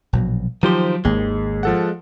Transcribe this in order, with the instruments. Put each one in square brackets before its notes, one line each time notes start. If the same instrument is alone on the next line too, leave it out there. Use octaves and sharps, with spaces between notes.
[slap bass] A#1 B2 F#3
[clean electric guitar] D#3 C5 [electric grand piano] F3 G4 [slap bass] F#3
[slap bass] G#1 A#3 [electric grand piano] D#2 [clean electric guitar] G#3
[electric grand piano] F3 A4 F#5